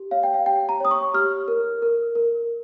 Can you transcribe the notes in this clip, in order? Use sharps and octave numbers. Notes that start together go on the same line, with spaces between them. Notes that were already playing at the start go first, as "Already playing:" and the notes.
Already playing: G4
C#5 F5
G5
F5
G4 G5
A#5
C#5 D#6
C#6
G4 F6
A#4
A#4
A#4